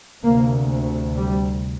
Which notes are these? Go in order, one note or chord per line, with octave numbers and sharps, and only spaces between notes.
D2 C3 A#3
G3